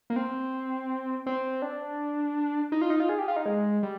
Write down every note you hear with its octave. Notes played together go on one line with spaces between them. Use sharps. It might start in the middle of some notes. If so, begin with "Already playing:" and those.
A#3
C4
C4
D4
D#4
F4
D#4
F4
G#4
G4
F4
D#4
G#3
G3